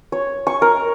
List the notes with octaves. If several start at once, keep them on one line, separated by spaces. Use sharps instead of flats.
C#5
C#6
A#4